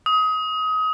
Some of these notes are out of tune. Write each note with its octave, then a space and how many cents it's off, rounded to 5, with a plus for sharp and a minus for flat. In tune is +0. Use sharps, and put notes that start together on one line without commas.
D#6 +25